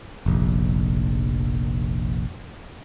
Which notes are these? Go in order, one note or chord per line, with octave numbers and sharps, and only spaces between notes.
F1 A#1